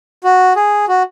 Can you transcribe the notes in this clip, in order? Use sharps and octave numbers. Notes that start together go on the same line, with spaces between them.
F#4
G#4
F#4